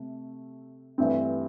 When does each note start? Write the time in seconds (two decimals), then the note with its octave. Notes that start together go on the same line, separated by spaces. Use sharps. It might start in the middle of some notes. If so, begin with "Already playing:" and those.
Already playing: C3 A3
0.98 G2 E3 A3 C4